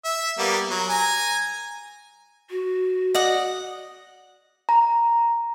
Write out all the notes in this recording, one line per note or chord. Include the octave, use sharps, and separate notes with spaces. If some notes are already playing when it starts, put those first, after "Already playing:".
E5
G3 A#3 B3
F#3 A#4
G#5 A#5
F#4
D5 D#5 F#5
A#5